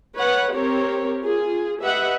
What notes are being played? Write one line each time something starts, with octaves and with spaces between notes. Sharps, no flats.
B4 C#5 F#5
C4 G4 A#4 C#5
F4 G#4
G4 B4 D#5 E5 F#5